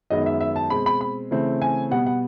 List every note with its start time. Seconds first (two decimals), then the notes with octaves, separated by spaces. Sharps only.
0.10 F#2 D#3 G#3 B3 D#5
0.26 E5
0.41 E5
0.56 A5
0.70 B2 G#3 C4 B5
0.86 B5
1.01 B5
1.31 C#3 E3 A3 C4
1.62 G#5
1.91 B2 G3 B3 F#5
2.06 F#5